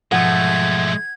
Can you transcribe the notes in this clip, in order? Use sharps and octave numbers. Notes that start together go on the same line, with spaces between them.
B1 G#2 F3 G#3 A3 F#5 G#6